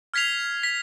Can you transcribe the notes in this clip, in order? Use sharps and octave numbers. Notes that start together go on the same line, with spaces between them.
F6 G#6 B6 C7 F7
B6